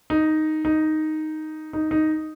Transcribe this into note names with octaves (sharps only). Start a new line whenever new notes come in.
D#4
D#4
D#4
D#4